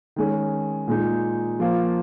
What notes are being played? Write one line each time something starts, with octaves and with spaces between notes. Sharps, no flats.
D#3 G#3 C#4
A#2 G#3 D#4
F3 A#3 F4